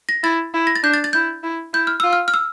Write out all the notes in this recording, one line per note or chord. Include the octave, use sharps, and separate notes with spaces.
A#6
E4 A6
E4
A#6
A6
D4 G6
A6
A6
E4 G6
E4
E4 G6
F6
F4 E6
F6
F6
E6